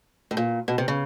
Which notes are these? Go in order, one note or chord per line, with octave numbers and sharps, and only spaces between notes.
A2
A#2
B2
C3
C#3